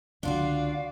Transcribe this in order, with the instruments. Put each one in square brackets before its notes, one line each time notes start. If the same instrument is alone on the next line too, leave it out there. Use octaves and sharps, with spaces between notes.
[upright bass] C#2 D3 [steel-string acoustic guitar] D4 F4 F#4 [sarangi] D5 [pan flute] F5